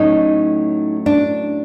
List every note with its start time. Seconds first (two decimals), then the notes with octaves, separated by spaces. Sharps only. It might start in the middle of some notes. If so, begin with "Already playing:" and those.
Already playing: A2 F#3 A3 C#4 D#4
1.06 D4